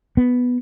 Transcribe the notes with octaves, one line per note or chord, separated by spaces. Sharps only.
B3